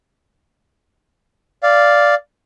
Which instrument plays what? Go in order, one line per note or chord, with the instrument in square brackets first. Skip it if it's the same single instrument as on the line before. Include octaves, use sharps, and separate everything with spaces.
[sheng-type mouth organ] D5 F5